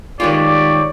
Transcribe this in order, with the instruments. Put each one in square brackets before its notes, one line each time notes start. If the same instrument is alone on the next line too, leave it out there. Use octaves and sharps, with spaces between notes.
[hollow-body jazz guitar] D#3 G#3 F4 [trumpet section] G4 C#5 D5